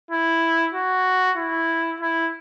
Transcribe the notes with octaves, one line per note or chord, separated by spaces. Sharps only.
E4
F#4
E4
E4